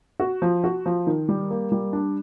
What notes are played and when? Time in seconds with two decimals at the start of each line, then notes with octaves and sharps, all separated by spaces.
0.20 F#4
0.42 F3
0.64 F#4
0.86 F3
1.07 D#3
1.29 G3
1.51 A#3
1.72 G3
1.93 D4